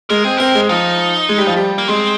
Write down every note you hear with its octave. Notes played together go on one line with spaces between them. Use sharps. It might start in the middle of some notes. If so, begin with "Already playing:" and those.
G#3 A#4
C4 G#4
C4 A#4
G#3
F3 D#4
G#3
G3
F3
G3
A#3
G#3 C4